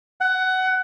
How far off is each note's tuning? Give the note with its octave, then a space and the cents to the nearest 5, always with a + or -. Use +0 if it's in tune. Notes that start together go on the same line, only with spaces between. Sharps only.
F#5 +15